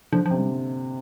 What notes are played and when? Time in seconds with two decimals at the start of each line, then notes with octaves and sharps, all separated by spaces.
0.12 D3 F3
0.26 C3 F3
0.38 G3